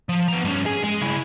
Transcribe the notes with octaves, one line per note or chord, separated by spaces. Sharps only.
F3
B3 A#5
G2 C#4
G#4
G#3
C#3 E4